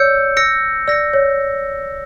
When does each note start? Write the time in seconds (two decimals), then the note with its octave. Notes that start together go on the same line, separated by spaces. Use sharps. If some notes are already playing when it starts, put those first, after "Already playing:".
Already playing: C#5 D5 E6 G6 C#7
0.37 E6 A#6 C#7
0.88 D5 E6 A#6 C#7
1.13 C#5